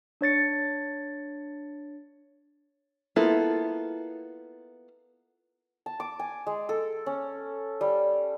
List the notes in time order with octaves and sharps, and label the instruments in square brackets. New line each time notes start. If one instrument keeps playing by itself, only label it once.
[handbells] D4 C#5 A6 C#7
[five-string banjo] A#3 B3 E4 F4 A4
[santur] A5
D6
G#5
G#3
A4
C#4
G3